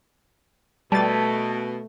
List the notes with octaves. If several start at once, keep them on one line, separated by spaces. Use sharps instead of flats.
B2 G3 A3 A5 A6